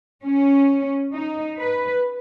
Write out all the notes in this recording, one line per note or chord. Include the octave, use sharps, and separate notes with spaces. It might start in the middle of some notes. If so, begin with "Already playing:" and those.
C#4
D#4
B4